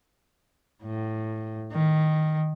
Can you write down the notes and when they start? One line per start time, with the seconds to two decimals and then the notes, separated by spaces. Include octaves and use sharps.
0.84 A2
1.72 D#3